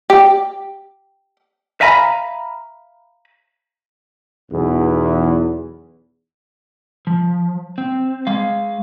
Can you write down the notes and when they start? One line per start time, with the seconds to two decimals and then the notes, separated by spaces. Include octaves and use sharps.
0.10 G4
1.81 E5 F5 G#5 A#5 B5
4.50 B1 E2
7.07 F3
7.78 C4
8.27 G#3 F5